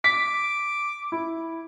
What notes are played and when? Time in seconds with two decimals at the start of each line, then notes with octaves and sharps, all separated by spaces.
0.04 D6 B6
1.12 E4